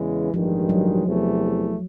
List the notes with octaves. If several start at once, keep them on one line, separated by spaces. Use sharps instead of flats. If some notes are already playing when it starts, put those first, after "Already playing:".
Already playing: E2 C#3 E3 G#3
A1 G2 D#3 F3 G#3
F#3
E2 C3 E3 A3